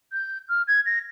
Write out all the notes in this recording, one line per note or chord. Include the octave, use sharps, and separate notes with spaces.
G6
F6
G#6
A#6